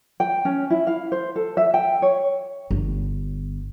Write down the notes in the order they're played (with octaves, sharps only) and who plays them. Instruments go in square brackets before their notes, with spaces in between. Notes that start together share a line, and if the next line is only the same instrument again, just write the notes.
[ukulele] G5
C#4
E4
F5
C5
A4
E5
G5
C#5
[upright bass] G1